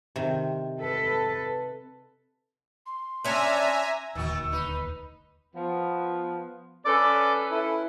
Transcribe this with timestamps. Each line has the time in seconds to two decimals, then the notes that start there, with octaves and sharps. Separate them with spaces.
0.16 C3 D#3
0.81 A4 B4
2.86 C6
3.25 C#4 D4 E5 G#5 A#5
4.15 D#1 D2 A#2 D#3 F#4 C#6 D#6 E6
4.52 D#4 B4
5.54 F3 B3
6.85 C#4 A4 B4 D5 D6
7.51 E4